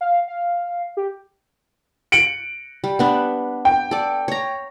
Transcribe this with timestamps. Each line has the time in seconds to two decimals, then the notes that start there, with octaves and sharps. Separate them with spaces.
0.01 F5
0.28 F5
0.97 G4
2.12 C#7 D7 F#7
2.84 G3
2.99 B3 D4 B4
3.65 G5
3.91 A4 D5
4.28 C#5 A#5